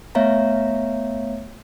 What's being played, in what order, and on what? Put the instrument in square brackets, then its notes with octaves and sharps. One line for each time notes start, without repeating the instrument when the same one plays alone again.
[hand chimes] A3 B3 C#5 E5 F5 A#5